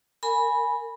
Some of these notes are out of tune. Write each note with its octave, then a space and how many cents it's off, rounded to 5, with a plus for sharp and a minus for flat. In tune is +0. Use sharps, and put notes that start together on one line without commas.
A#4 -30 G#5 +0 B5 -10